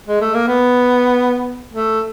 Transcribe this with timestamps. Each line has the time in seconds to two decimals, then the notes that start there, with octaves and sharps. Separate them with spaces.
0.07 G#3
0.21 A3
0.34 A#3
0.48 B3
1.73 A3